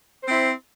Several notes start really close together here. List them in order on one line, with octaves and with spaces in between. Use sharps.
C5 C4 E4